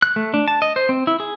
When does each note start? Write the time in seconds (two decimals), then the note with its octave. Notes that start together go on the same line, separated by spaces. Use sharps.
0.02 F#6
0.16 A3
0.34 D4
0.48 A5
0.62 D#5
0.76 C5
0.89 C4
1.07 E4
1.20 G#4